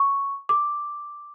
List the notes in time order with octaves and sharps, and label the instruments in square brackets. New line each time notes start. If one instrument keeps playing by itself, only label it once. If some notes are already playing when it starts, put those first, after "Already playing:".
Already playing: [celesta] C#6
D6